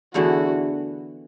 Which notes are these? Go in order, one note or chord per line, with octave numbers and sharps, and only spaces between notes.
E2 D3 A3 E4 F#4